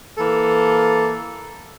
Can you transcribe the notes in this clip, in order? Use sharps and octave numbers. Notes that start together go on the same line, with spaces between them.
E3 A#3 A4